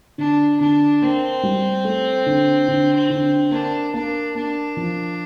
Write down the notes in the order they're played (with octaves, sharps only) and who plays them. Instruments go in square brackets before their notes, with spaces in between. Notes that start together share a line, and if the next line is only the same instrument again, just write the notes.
[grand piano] D3 [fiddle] D4
[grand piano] D3 [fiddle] D4
[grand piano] A#3 [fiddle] C4
[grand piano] G3
A3
D3
D3
D3
[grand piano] A#3 [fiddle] D4
[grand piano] A#3 [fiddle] D4
[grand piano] A#3 [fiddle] D4
[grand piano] F3